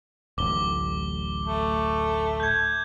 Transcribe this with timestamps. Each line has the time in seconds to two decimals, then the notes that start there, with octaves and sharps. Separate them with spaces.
0.38 D1 A1 D6 G7
1.45 A3
2.40 G6 G#6